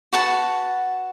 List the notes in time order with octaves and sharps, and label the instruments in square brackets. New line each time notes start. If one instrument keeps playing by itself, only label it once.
[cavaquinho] F#4 B4 F#5 A5